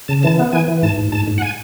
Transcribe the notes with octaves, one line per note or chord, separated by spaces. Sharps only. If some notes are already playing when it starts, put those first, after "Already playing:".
C#3 A5
E3 A5
B3
E3 G#5
E3
G#2 A5
G#2
G#2 A5
G#2
F#5
G#5